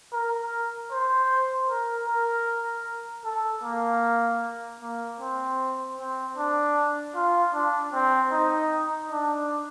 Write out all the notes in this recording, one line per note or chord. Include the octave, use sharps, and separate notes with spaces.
A#4
C5
A#4
A#4
A4
A#3
A#3
C4
C4
D4
F4
D4
C4
D#4
D4